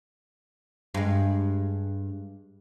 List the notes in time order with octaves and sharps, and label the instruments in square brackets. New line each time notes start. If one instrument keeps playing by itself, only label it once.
[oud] G2 G#3